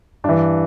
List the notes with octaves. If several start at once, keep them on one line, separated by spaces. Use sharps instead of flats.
G2 E3 D4